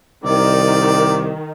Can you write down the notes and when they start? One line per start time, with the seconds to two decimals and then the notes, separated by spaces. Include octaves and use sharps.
0.25 C2 D#3 D5